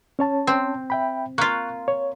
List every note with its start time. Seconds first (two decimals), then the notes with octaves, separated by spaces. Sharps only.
0.19 C#4 C#5 A5
0.47 C4
0.90 E5 G5 B5
1.38 A#3 F4 C#6 F#6
1.88 C#5